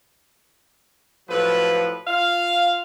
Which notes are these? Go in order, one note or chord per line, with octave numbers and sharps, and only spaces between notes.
A2 F3 F#3 B4
F4 F5